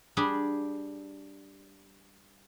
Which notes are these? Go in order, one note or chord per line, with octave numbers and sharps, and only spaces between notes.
G3 D4 G4 G#4